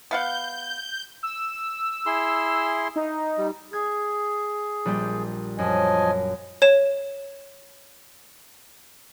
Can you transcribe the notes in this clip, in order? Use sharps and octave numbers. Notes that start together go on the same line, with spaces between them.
B3 F5 F#5 G6
E6
E4 G#4 C6
D#4
G3
G#4 G#6
A#1 G3 G4
F#2 F3 D#5 G#5
C#5 E7